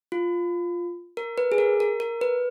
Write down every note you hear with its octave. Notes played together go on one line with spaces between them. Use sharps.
F4
A#4
B4
G#4
A#4
A#4
A#4
B4